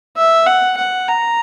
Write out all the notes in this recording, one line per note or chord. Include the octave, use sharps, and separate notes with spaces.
E5
F#5
F#5
A#5